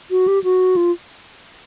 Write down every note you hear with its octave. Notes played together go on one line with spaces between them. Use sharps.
F#4
G4
F#4
F4